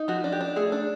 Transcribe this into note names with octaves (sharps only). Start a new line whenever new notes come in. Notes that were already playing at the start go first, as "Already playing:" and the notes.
Already playing: D#4
F3 F#4
D4
G4
D4
A3 G#4
D4